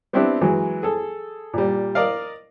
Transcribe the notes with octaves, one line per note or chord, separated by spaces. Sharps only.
B3 C4 D4 E4 G4 B4
E3 F#3 G#3
G#4 A4
A#2 G3
A#4 D5 D#5 F5